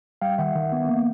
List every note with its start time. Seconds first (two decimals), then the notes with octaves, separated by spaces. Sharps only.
0.22 G3 F5 G5
0.38 D#3 E5 F#5
0.55 D#3
0.73 B3
0.89 A#3